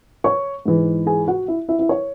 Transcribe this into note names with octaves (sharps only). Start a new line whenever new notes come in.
C#5 C#6
G#2 E3
G#4 G#5
F#4 F#5
E4 E5
E4 E5
E4 E5
C#5